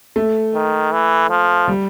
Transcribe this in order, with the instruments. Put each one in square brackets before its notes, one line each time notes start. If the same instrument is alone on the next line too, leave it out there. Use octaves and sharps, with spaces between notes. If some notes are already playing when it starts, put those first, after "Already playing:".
[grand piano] A3
[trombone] D#3
E3
F3
[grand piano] G3